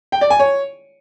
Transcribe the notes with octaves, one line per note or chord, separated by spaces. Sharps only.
G5
D5
G#5
C#5